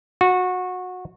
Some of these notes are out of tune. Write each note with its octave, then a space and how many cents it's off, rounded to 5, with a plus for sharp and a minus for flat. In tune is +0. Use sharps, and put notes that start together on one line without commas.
F#4 -20